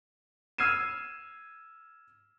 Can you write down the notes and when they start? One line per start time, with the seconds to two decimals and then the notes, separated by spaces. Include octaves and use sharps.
0.58 E6 F6 G#6 C7 D#7 E7